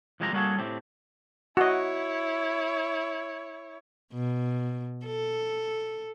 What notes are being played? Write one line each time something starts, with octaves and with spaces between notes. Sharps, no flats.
C2 F3 G#3 C4 G4 A#5
G3 A#3 C#4 F#4 G#4 A4
A2 C4 G4
E4 F#4 C#5 D#5
B2
A4